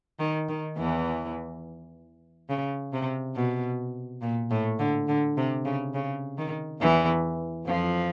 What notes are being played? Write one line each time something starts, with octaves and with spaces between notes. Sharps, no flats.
D#3
D#3
E2 E3
C#3
C3
B2
A#2
A2
D3
D3
C3
C#3
C#3
D#3
E2 E3
F2 F3